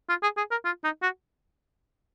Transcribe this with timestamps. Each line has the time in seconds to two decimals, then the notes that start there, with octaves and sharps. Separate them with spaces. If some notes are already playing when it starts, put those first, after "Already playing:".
0.09 F4
0.22 G#4
0.37 G#4
0.51 A#4
0.64 F4
0.84 D#4
1.02 F#4